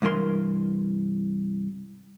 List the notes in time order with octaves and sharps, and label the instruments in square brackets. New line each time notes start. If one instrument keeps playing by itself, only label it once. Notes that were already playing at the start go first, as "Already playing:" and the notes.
[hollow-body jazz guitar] C2 G2 E3 A#4 C6